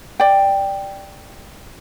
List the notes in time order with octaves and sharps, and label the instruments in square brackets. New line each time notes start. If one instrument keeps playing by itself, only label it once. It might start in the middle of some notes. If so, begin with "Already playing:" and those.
[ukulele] D5 G5